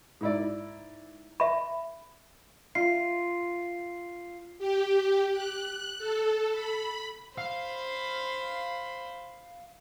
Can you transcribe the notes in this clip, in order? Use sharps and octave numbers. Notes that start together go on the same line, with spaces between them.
G#2 E4 D5
E5 B5
F4 C7
G4
F#6
A4
B5
C5 F5 B5